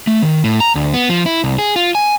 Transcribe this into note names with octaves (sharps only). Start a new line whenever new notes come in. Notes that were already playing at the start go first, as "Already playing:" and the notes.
A3
D#3
A2
A#5
D2
B3
F3
E4
C2
G#4
F4
G#5